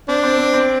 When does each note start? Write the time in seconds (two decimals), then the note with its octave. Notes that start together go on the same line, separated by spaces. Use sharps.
0.08 C4 D4
0.23 C4
0.38 C4
0.53 C4